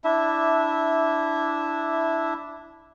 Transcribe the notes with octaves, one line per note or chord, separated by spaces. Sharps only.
D4 E4 E5